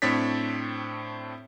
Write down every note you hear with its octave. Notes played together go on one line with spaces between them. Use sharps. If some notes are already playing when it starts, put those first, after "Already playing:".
A2 C4 D4 C#5 A6 B6